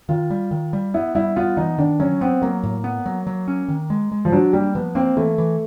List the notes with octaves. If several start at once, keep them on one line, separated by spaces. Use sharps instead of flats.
D#3 F4
G3
D#3
G3
B3 E4
G3 E4
B3 F4
E3 D#4
D#3 D4
F#3 C#4
B3 C4
F#3 A#3
A2
B3
F#3
F#3
C#4
D#3
G#3
G#3
F3
F#3 D4
G3 A#3
F3 B3
A#3 C4
E3 A3
E3